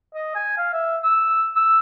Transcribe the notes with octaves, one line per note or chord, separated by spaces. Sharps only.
D#5
G#5
F5
E5
E6
E6